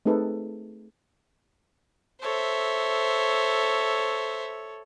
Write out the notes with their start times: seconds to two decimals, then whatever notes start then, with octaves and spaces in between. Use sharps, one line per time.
0.05 A3 C4 D#4 G#4 A4 B4
2.22 A4 C5 C#5 E5